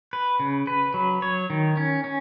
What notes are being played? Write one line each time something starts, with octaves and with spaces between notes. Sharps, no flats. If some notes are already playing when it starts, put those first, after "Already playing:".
B4
C#3
B4
F#3
C#5
D#3
C#4
C#4